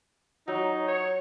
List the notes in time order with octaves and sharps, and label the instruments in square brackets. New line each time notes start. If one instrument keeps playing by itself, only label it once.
[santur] F#3 [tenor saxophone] D#4
[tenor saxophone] C#5